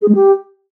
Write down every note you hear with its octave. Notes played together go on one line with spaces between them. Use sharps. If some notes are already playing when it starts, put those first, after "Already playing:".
G#4
G#3
G4